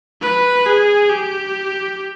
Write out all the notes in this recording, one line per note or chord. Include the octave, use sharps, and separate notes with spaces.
B4
G#4
G4